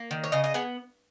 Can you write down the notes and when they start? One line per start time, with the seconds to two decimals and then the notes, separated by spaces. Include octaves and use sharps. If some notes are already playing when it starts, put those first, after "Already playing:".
Already playing: A#3
0.11 D#3
0.24 C#5
0.32 C#3 D#5
0.44 D#5
0.54 B3 G#4